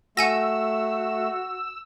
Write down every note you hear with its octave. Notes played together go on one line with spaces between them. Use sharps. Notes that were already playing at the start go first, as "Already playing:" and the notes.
A3 F#4 F#5 G#5 E6 A#6